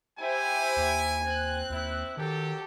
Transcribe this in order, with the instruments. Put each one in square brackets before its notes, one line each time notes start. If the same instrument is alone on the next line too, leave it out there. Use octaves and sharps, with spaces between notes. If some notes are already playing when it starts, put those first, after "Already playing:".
[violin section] E4 G4 C5 [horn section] G#5
[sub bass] D#2
[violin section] C4 F#6
[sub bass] D#2 [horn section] E4
[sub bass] D#3 [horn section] F#3 G4 [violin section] A4